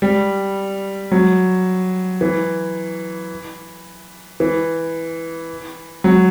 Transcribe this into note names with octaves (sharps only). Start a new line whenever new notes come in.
G3
F#3
E3
E3
F#3